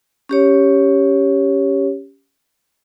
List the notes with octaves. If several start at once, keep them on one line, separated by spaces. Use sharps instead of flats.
C#4 G4 C#5